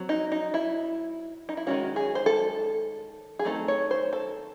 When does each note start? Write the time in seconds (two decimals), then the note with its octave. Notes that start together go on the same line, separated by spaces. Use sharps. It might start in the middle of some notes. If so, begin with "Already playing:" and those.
Already playing: F#3 C4
0.09 D#4
0.32 D#4
0.54 E4
1.49 D#4
1.57 E4
1.67 D#3 G#3 C#4 F#4
1.96 G#4
2.15 C5
2.26 A4
3.39 G#4
3.45 D#3 A3 C4 D#4 A4
3.68 C#5
3.91 C5
4.13 A4